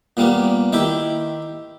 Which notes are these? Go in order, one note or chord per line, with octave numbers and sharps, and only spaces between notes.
A#2 G3 A#3 B3
D#3 E4 G4